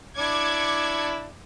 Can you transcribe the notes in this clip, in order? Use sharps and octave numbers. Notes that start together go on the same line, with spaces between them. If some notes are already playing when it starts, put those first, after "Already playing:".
D4 E4 D6 G#6 C#7